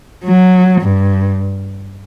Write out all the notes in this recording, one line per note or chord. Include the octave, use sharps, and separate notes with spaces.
F#3
G2